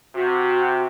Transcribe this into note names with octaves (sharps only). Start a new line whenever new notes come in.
C3 F#4